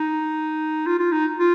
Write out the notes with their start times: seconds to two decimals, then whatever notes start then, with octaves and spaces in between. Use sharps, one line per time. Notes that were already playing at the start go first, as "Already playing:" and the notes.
Already playing: D#4
0.86 F4
0.99 F4
1.12 D#4
1.39 F4